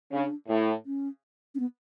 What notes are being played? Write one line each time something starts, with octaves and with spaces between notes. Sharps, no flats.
C#3 D4
A2
C#4
C#4
B3